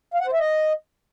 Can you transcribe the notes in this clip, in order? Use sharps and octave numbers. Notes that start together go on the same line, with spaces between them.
F5
F#5
C5
E5
D#5